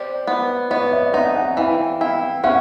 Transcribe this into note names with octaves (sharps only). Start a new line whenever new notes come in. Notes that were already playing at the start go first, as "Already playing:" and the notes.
Already playing: G4 C5 D5
B3
B3 C#5 D#5
D5 E5
D#4 E5 F#5
F#5 G#5
E3 F5 G5
E4 F5 G5
C#4 E5 F#5